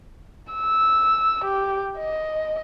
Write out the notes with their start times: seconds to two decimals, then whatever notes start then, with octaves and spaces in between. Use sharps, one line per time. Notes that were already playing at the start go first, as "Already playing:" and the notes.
0.53 E6
1.45 G4
1.99 D#5